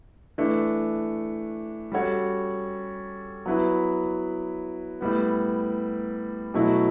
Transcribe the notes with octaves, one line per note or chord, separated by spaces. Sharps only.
E3 A3 D4
G3 C#4 F#4 A4 C#5
F#3 B3 E4 B4
A2 G3 B3
B2 F#3 A3 E4